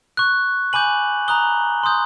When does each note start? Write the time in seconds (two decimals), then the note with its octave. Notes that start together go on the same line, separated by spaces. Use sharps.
0.17 C#6 F#6
0.73 G#5 B5 D6 G6 F#7
1.28 A#5 D#6 F#6 G7
1.83 C6 D#6 G6